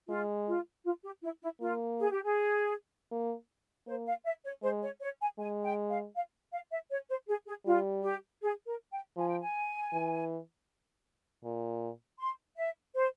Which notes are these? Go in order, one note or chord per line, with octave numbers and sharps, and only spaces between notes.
G#3 F4
F4
F4
G4
E4
E4
A#3 F4
G#4
G4
G#4
A#3
A#3 C5
F5
E5
C#5
G#3 C5
C#5
C#5
G#5
G#3 G#5
G5
F5
F5
F5
E5
C#5
C5
G#4
G#4
G3 F4
G4
G#4
A#4
G5
F3 G#5
G5
G#5
E3
A#2
C6
E5
C5